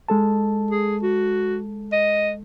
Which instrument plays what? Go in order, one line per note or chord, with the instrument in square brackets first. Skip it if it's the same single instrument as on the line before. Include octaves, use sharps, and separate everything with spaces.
[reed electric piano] G#3 A4 A5
[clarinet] G#4
F#4
D#5